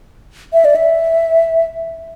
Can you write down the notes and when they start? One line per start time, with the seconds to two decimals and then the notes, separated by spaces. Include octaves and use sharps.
0.53 E5
0.65 D5
0.76 E5